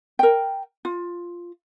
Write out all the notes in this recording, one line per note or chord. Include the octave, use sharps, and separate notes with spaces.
A#4 G5
F4